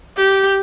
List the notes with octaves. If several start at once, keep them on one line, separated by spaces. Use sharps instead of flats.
G4